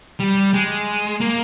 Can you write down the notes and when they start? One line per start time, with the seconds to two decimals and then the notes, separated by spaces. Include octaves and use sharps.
0.20 G3
0.54 G#3
1.21 A#3